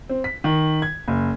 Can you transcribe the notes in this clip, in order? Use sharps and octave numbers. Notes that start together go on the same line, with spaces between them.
C4
B6
D#3
G#6
F#1